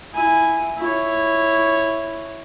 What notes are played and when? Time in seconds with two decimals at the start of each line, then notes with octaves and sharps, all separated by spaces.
0.13 E4 G#5
0.77 E4 C#5